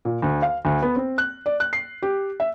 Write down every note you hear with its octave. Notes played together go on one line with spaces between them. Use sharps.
A#2
D2
F5
D2
B3
C4
F#6
D5
F#6
C7
G4
E5